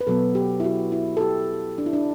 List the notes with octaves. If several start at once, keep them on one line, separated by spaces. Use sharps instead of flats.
B4
B2 F#3 B3 A4
G4
E4
F#4
E4
A4
G4
D4
E4
D4